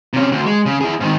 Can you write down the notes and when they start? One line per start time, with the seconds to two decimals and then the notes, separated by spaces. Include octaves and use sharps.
0.13 C3 C#4
0.32 D2
0.46 G#3
0.66 C#3
0.81 E4 G#4
1.00 G#2 D#3